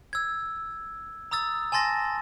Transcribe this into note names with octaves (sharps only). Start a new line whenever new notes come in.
E6 G#6
A#5 D#6 E6 A6
G#5 A5 C6 A6 A#6